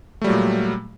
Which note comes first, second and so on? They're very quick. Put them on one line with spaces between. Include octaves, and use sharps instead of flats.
A3 G3 F#3 A#2